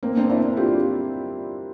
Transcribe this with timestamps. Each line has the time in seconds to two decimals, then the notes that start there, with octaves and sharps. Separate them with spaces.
0.03 A#3 C4
0.17 C4 D4
0.30 D4 E4
0.57 F4 G4